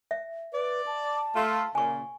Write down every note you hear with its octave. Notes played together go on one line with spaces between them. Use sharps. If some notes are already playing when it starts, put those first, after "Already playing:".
E5
B4 D5
A5
A3 F4
A#2 C#3 G#5 C#6